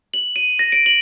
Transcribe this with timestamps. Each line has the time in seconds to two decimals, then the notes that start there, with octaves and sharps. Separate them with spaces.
0.14 F#7
0.36 D#7
0.59 A#6
0.72 D7
0.86 F#7